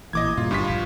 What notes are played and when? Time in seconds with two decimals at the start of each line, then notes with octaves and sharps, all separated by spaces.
0.13 A1 A#2 E3 D#5 D6 G#6
0.37 G2 A#2 C#3 F4
0.51 G1 G2 F4 B6
0.68 E1 A#1